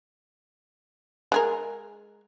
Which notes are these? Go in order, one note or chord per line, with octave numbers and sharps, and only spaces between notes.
G#3 G#4 A#4